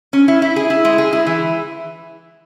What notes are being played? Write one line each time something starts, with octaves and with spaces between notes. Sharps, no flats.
C#4
E4
E4
G#4
E4
G#3
G#4
E4
E3